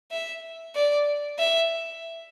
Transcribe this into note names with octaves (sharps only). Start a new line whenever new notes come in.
E5
D5
E5